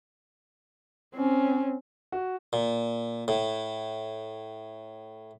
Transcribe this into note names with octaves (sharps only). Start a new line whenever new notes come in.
C4 C#4
F#4
A#2
A2